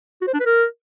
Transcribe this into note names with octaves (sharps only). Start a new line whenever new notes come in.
F#4
C5
D4
B4
A#4